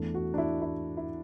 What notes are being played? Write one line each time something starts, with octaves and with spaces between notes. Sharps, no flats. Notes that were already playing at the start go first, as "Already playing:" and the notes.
Already playing: E2 E3 A3 D4
F#4
D4
E4
E4
E4